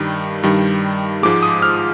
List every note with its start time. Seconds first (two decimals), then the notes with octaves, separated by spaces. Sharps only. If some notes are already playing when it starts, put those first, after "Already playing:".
Already playing: G2 D#3 G3
0.43 G2 D#3 G3
1.23 G#2 F3 G#3 D6
1.43 D#6
1.62 F6